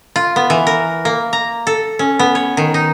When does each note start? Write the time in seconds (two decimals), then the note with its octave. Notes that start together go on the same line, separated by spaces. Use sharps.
0.16 F4
0.36 B3
0.50 E3
0.67 A#4
1.05 A#3
1.33 A#5
1.67 A4
1.99 C#4
2.19 B3
2.35 C#5
2.57 D#3
2.74 D#4